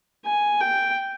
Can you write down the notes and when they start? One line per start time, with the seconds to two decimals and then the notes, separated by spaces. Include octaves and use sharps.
0.25 G#5
0.61 G5